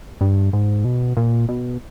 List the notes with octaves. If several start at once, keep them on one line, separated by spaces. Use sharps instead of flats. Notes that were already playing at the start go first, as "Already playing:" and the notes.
G2
G#2
B2
A#2
B2